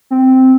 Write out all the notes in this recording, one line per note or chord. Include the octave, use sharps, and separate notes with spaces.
C4